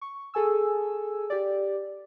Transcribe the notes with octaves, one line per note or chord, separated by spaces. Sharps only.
C#6
G#4 A4 G#5 E6
G4 D5